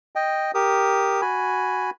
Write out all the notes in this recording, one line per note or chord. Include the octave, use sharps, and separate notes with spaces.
D#5 G5
G4 A#4 D#6
F#4 G#5 B5